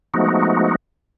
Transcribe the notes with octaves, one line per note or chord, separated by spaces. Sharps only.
F3 G#3 A3 B3 D#4 F#4